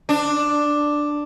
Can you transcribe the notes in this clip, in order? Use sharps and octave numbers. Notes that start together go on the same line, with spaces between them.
D4